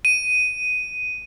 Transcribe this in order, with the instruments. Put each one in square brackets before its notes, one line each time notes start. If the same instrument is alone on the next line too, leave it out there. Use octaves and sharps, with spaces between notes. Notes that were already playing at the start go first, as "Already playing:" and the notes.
[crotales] D#7